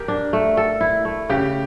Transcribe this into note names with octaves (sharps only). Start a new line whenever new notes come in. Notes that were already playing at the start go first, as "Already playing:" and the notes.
Already playing: G4 A#4
D4
A3
A4
E4
A3
C#3 G4